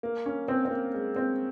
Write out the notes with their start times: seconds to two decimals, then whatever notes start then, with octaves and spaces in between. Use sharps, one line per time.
0.03 A#3
0.26 C#4
0.48 C4
0.65 C4
0.71 A#3
0.94 G#3
1.16 C4